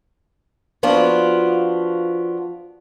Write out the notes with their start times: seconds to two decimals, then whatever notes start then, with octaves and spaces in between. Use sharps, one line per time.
0.83 F3 B3 D4 F4 F#4